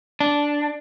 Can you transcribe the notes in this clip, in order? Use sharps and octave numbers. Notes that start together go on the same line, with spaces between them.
D4